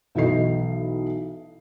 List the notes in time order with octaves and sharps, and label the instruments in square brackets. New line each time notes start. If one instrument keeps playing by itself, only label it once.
[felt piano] B1 E3 A4 D#5 C7